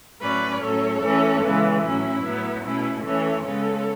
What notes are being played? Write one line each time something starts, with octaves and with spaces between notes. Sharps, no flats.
A2 F#3 C#4 B4 D5
A2 F#3 C#4 A4 C#5
E3 A3 C#4
C#3 E3 G#3 B3
A2 F#3 C#4 E4
A2 F#3 B3
B2 A3 C#4 E4
E3 A3 C#4 A4 C#5
C#3 G#3 B3 A4 C#5